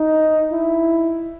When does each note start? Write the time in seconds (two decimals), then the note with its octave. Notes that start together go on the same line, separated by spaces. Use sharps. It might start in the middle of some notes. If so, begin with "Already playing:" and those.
Already playing: D#4
0.52 E4